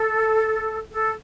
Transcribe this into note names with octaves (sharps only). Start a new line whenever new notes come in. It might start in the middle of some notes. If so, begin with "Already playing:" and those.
Already playing: A4
A4